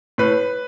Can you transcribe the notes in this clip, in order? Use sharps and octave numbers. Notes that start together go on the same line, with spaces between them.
A2 B4